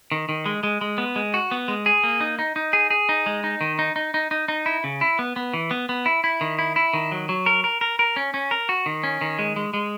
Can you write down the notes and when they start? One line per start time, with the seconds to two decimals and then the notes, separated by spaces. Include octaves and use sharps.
0.12 D#3
0.29 D#3
0.46 G#3
0.63 G#3
0.81 G#3
0.98 B3
1.16 G#3
1.34 F#4
1.51 B3
1.68 G#3
1.86 G#4
2.04 A#3
2.21 D#4
2.39 D#4
2.56 D#4
2.73 G#4
2.90 G#4
3.09 D#4
3.26 G#3
3.44 D#4
3.61 D#3
3.79 D#4
3.96 D#4
4.14 D#4
4.31 D#4
4.48 D#4
4.66 E4
4.84 C#3
5.01 E4
5.19 B3
5.36 B3
5.54 E3
5.71 B3
5.89 B3
6.06 E4
6.24 E4
6.41 D#3
6.59 E4
6.76 E4
6.93 D#3
7.12 F#3
7.29 F#3
7.46 A#4
7.64 A#4
7.81 A#4
7.99 A#4
8.16 C#4
8.34 C#4
8.51 A#4
8.69 F#4
8.86 D#3
9.04 C#4
9.21 D#3
9.39 G#3
9.56 G#3
9.74 G#3